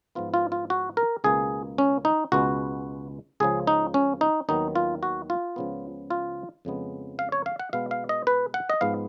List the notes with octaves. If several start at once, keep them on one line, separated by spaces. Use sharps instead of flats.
G#2 F3 B3 F4
F4
F4
F#4
A#4
C#2 B2 A#3 G#4
C#4
D#4
C#2 B2 G#3 B3 F#4
C#2 C#3 F3 G#4
D#4
C#4
D#4
D#2 D#3 F#3 B3 D#4
F4
F#4
F4
C#2 C#3 F3 B3
F4
F2 C#3 G#3 B3
F5
C#5
F5
F#5
B2 G#3 B3 F5
F5
D#5
B4
F#5
D#5
G#2 F3 G#3 B3 F5